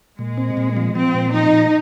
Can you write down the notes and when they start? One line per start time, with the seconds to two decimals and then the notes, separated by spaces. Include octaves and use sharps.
0.19 A#2 G#3
0.38 C4
0.57 A#2
0.77 F3
0.95 F3 C4
1.15 A#2
1.33 F3 D#4
1.53 A#2